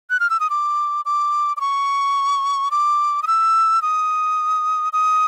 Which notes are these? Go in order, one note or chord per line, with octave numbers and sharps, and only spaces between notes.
F#6
F6
E6
D#6
D6
D6
D6
C#6
D6
D#6
E6
D#6
D#6